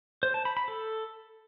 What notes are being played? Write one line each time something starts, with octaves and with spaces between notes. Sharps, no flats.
C5
A5
B5
B5
A4